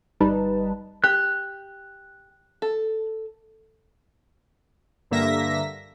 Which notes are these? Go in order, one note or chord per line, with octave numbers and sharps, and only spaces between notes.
G1 G3 D#4 B4 A5
G4 F#6
A4
G2 D3 A#3 E5 A#6 B6